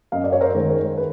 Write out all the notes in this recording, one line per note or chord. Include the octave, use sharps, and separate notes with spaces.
F#2 D#5 F5
D5
C#5
A#4 C5
D#3 G#3
A#4 C5
B4